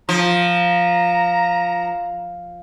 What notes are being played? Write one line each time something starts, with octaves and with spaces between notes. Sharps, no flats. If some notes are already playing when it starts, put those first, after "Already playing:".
F3 A#5